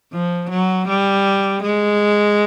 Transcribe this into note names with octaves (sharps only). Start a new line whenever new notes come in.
F3
F#3
G3
G#3